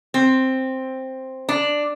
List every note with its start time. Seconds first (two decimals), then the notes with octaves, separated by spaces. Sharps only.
0.14 C4
1.49 D4